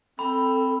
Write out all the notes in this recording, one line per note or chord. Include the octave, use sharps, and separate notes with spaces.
C4 A4 B5